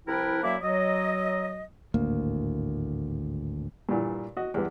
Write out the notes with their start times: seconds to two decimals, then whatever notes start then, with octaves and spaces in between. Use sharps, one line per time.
0.07 C2 F3 E4 A#4 B4 G5
0.42 F#2 F#3 A#3 E4 D5 E5
0.61 F#3 D#5
1.94 G#1 D2 A2 A#3
3.89 G2 A#2 E3
4.37 F#4 D#5
4.54 E2 G3 B4